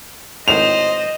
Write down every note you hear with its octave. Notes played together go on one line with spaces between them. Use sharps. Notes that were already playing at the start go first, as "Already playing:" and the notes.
G#1 A2 C5 D#5 F7